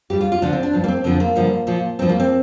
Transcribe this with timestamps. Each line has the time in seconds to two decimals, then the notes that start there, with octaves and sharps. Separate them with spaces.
0.10 G2 G3 G4
0.21 F4
0.32 F4
0.42 D2 D3 F3 D4
0.53 C4
0.63 D4
0.73 G2 F3
0.84 A#3
0.88 C4
1.04 F2 D3 F3 C4
1.20 A#3
1.35 G2 D3 F3
1.67 A#2 F3
1.99 G2 F3 C4
2.09 A#3
2.20 C4